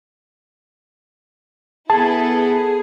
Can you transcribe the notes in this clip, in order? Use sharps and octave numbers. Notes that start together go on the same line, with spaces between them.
B3 E4 G#4 A4 A5